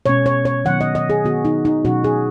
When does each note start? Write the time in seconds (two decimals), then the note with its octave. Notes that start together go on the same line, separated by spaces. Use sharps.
0.06 B2 G#3 C#4 C#5
0.26 C#5
0.45 C#5
0.65 D#3 F#3 B3 F#5
0.81 D#5
0.95 D#5
1.10 G#4
1.24 D#3 B3 F#4
1.45 D#4
1.65 D#4
1.85 B2 F#3 C#4 F#4
2.04 G#4